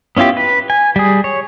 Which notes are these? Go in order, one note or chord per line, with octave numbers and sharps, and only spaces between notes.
B3 C#4 E4 F4 G4
B4
G#5
G3 G#4
C#5